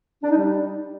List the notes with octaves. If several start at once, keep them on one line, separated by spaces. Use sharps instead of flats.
D4
D#4
G3